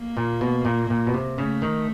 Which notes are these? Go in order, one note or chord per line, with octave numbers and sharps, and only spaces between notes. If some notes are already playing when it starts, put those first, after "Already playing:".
Already playing: A#3
A#2
B2
A#2
A#2
B2
C3
C#3 A3
D#3